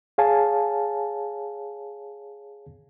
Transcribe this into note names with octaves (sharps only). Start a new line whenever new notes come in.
G#4 C#5 F5 G#5 A5